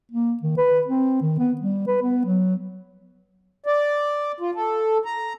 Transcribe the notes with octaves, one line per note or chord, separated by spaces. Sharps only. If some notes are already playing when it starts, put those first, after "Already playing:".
A#3
D#3
B4
C4
D#3
B3
G3
B4
B3
F#3
D5
F4
A4
A#5